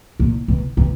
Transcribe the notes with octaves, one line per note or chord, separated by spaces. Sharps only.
A#2
B2
B2